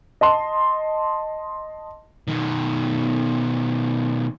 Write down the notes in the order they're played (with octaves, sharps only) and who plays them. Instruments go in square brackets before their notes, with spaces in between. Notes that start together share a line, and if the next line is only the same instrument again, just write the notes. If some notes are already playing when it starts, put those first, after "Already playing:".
[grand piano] D#5 A5 C6
[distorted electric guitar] B2 D#3